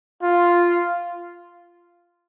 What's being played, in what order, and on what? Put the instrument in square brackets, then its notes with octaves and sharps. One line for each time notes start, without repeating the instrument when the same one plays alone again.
[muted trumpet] F4